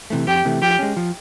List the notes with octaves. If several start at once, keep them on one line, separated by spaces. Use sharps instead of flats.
C3 E3 A3
F2 G4
C3 E3 A3
F3 G4
G#3 C#4
F3